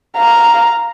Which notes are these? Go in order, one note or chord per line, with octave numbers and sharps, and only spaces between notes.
F5 A#5